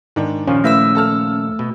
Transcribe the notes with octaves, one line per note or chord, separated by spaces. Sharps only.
G#2 D#3 D4
D#2 A#2 F3 C#4
A3 E4 B4 E5 E6
A4 A5 F6
B2